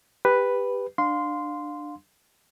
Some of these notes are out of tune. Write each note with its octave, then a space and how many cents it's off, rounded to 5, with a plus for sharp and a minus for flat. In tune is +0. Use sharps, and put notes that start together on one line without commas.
G4 +15 B4 +0
D4 +20 F5 +20 C6 -10